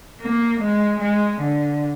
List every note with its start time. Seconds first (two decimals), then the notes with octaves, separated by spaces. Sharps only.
0.21 A#3
0.60 G#3
1.00 G#3
1.40 D3